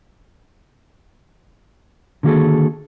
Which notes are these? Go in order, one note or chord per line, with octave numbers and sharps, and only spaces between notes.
D3 D#3 A#3 F#4 G#4 A4